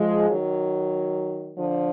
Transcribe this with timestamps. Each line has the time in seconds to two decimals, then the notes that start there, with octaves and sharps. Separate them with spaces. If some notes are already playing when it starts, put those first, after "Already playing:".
Already playing: F3 G#3
0.30 D#3 F#3
1.56 D3 F3